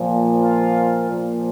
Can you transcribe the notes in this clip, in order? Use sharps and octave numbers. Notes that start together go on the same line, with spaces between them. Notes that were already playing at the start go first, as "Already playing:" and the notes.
Already playing: A#2 F3
F4
A#2 F3